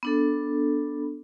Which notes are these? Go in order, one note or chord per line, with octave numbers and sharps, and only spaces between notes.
B3 D4 A4